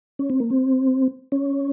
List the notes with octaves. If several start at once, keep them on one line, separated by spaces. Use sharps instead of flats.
C#4
C4
A#3
C4
C#4